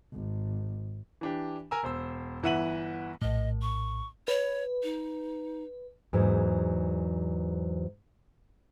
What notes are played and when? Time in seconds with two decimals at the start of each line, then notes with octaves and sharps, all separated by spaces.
0.13 G#1
1.21 E3 D4 G4
1.71 A#4 G#5 A#5 E6
1.83 E1 C5 E6
2.43 G1 E3 E5 F#5 D#7 F#7
3.22 A#1 A2 D#5
3.62 C#6
4.28 B4 C#5
4.83 D#4
6.13 E2 G#2 F#3